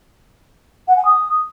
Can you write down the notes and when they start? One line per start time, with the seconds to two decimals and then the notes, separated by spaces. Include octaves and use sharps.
0.88 F#5
0.96 G#5
1.05 D#6